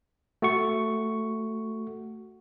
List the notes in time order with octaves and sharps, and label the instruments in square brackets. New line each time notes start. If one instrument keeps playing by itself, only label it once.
[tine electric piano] A3 F#4 C#6